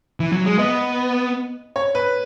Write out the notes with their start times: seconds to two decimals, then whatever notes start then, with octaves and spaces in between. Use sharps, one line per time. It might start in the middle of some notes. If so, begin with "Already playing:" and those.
0.20 E3
0.32 F#3
0.46 G#3
0.58 B3 D#5
1.76 C#5
1.95 B4